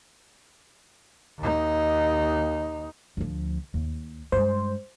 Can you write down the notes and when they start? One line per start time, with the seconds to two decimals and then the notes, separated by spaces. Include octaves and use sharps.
1.39 D#2 D#4
3.17 D2 F3
3.74 D#2
4.32 G2 G#3 C5